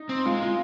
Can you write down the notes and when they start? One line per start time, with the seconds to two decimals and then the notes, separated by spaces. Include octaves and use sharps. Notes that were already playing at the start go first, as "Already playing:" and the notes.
Already playing: D#4
0.09 C4
0.26 G#3 F4
0.42 F4